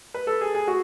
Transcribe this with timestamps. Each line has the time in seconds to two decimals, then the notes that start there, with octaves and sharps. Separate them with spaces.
0.14 B4
0.27 A4
0.41 G#4
0.55 G#4
0.68 F#4